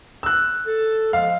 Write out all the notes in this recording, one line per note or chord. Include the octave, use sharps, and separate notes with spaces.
E6 F#6
A4
F3 G#3 F5